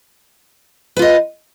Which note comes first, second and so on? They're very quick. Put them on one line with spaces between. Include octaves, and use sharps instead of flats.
B4 F4 D#5